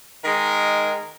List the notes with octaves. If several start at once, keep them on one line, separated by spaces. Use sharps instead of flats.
D#3 G#3 A#4